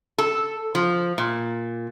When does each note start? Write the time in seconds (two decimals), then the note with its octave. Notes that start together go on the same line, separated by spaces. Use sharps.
0.18 A4
0.75 F3
1.18 A#2